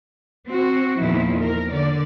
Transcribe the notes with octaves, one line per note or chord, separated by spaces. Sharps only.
C4 F#4
E2 A#2 D#3 F3 E4
A#4
D3 D5